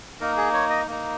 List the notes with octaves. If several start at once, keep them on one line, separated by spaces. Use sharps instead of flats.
A#3 D#4 A#4
G#4
C#5
D#5
A#3 D#4